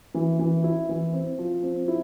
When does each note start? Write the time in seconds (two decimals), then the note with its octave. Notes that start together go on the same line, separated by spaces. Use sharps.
0.15 E3
0.39 E3
0.64 E4
0.89 E3
1.13 C4
1.39 F3
1.63 C4
1.88 E4